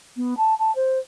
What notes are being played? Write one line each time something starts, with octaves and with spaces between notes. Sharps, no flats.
B3
A5
A5
C5